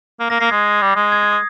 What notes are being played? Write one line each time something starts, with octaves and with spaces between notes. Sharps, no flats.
A#3
A#3 A#6
A#3 C7
G#3 G#6
G3
G#3
G#6
G#6
D#6